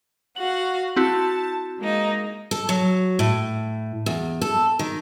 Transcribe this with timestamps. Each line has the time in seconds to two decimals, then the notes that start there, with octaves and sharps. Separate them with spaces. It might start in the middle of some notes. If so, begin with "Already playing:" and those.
0.36 F#4 F5 F#5 F#7
0.96 C4 E4 F#4 A5
1.79 G#3 A#3 D#4
2.51 A4
2.69 F#3
3.19 A2
4.06 E2
4.41 A4
4.79 D#3